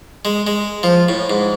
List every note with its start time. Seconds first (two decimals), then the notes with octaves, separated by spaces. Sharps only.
0.25 G#3
0.47 G#3
0.83 F3
1.09 A2
1.30 G#2